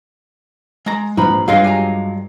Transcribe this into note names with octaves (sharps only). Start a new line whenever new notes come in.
G#3 A#5
A#1 G#2 F3 B4 A#5 B5
G2 F#3 G#3 F4 B4 D#5 F5 C7
G4 G#5 A#5